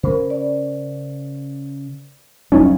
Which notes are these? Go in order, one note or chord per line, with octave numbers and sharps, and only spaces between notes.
C#3 C#4 A#4 C5
D5
D1 D#2 F#3 G3 C#4 D#4